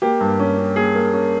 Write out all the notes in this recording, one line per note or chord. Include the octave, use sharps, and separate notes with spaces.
A#3 G4
G2
C#4
C#4
A#3 G#4
A#3
C#4